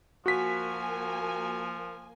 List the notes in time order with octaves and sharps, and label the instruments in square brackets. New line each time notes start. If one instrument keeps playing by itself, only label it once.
[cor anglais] F3 [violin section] A#3 G#5 [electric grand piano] F#4 B6